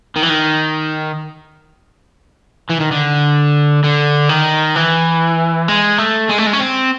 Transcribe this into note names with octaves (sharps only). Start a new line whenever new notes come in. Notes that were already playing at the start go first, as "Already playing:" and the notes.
D#3
E3
D#3
E3
D#3
D3
D3
D#3
E3
G#3
A3
G#3
A3
G#3
C#4
C4